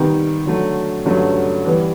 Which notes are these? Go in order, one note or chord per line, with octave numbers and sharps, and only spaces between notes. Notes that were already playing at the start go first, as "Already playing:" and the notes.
Already playing: C3 D#3 G3 B3 D#4
D3 F#3 A3
G2 D3 F#3 A3 C#4
E3 G3 B3